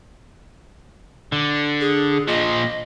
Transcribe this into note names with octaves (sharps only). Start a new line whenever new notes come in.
D3
G#4
A#2 F3 D#5